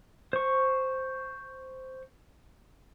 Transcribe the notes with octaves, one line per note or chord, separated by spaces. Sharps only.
C5 C#6